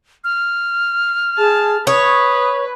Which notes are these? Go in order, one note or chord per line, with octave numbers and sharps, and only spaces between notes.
F6
G#4 A5
B4 C#5 D#6